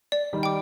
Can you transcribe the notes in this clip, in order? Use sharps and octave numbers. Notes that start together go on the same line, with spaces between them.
D5
D#3 G3
G5 D6